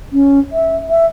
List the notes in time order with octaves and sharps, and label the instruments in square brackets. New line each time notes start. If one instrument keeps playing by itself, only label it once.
[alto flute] C#4
E5
E5